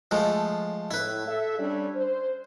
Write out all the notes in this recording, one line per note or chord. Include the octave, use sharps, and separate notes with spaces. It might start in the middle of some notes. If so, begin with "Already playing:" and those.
F3 G#3 A3
A2 E4 B4
A4 E5
G3 C#4 D4
C5